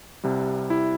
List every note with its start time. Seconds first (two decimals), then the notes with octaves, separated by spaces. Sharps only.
0.24 C2 C3 G3
0.70 E4